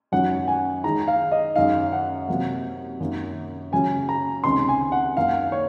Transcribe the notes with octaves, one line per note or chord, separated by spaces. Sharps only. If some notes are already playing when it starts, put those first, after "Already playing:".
F#2 D#3 F#3 C#4 F#5
G#5
D#3 G#3 D#4 G#4 A#5
F5
D#5
F#2 D#3 G#3 D#4 F5
F#5
C3 F#3 A#3
F#2 D#3 A#3
C#3 F#3 C#4 G#5
A#5
C#2 C3 D#3 G#3 C#4 C6
G#5
F#5
F#2 D#3 A#3 D#4 F5
C#5